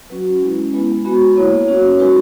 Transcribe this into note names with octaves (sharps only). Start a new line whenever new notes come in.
F#3 C#4 F#4 B4
G#3 C#4 E4
G#3 B3 E4 B4
G#3 B3 F#4
A#3 E4 C#5
A#3 C#4 F#4
G#3 D#4 F#4 B4